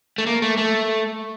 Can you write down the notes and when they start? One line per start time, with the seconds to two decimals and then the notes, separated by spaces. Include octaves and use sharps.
0.18 A3
0.26 A#3
0.42 A3
0.57 A3